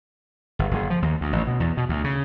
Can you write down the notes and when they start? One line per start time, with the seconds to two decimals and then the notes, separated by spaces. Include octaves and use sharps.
0.59 G1
0.71 F#1
0.90 F3
1.02 D#2
1.21 D2
1.33 A1
1.47 B2
1.60 E2
1.77 B2
1.89 D2
2.04 C#3